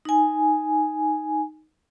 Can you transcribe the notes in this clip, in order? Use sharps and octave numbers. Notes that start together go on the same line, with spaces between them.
D#4 G#5